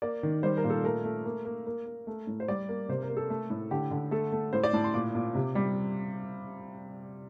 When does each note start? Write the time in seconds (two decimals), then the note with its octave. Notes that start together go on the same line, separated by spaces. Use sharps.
0.02 A#3 D5
0.23 D#3
0.43 G3 C5
0.57 A#4
0.64 A#2
0.70 A4
0.83 A3 A#4
1.04 A3
1.25 A#3
1.45 A#3
1.67 A#3
1.86 A#3
2.07 A3
2.27 A2
2.40 C5
2.48 G3 D5
2.69 A#3
2.89 C3 C5
3.02 A#4
3.09 A#3
3.17 A4
3.30 A3
3.50 A2
3.71 D3 G4
3.91 D3
4.11 A3 A4
4.32 A3
4.53 A2 C5
4.64 D5
4.73 A2 A5
4.84 C6
4.94 A#2 D6
5.15 A#2
5.35 C3
5.55 G3